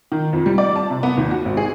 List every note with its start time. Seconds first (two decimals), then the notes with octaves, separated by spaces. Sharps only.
0.12 D#3
0.33 F2
0.46 G3
0.58 D5
0.76 A5
0.90 C3
1.03 B3
1.17 D#2
1.31 F#4
1.45 G#1
1.57 G#4